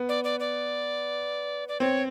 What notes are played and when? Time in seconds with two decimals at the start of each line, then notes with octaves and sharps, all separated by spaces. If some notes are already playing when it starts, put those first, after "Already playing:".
Already playing: B3
0.09 D5
0.24 D5
0.40 D5
1.68 D5
1.80 C4 C#5